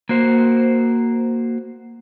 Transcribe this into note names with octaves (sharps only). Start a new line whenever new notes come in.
A#3 F#4 C5